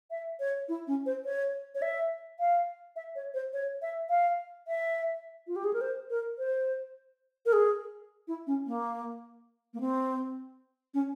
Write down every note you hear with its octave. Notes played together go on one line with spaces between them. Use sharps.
E5
C#5
E4
C#4
C5
C#5
C#5
E5
F5
E5
C#5
C5
C#5
E5
F5
E5
F4
G4
G#4
A#4
C5
A#4
C5
A#4
G#4
E4
C#4
A#3
A#3
C4
C#4